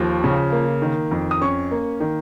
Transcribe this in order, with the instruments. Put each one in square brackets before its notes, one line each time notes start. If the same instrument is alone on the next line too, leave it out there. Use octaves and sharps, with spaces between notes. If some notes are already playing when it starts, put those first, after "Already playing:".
Already playing: [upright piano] D#2 F3
C#3
A#3
D#3
F2
D#6
C#4 C#6
A#3
D#3